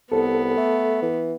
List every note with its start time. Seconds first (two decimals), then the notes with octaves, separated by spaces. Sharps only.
0.12 C2 B3 A4
0.57 A3
1.02 E3